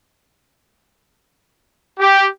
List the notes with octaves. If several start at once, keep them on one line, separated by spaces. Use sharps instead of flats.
G4